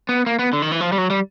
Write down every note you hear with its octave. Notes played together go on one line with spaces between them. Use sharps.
B3
A#3
B3
D3
D#3
E3
F3
G3
F#3
G3